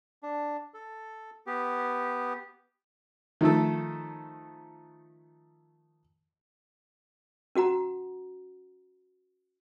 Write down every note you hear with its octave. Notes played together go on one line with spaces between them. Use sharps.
D4
A4
B3 G4
D#3 F3 A3 A4
C#4 F#4 F#5 A#5